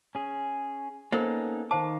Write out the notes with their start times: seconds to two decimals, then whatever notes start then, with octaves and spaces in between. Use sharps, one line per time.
0.15 C#4 G#4
1.12 A#3 B3 C#4 D#4 A4 A#4 C5
1.71 D#3 C5 F5 A5 D6